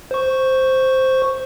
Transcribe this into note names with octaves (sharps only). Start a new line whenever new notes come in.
C5 C#6